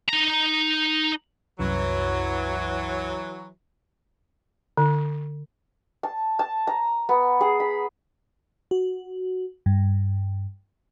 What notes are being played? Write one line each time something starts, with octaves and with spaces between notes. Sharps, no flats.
D#4 A#5
C2 F#2 E3 F#3
D3
A5
A5
A#5
B3
G#4
B5
F#4
G2